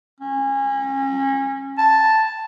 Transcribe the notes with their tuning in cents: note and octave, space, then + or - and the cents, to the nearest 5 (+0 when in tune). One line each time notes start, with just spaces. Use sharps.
C#4 -30
A5 +0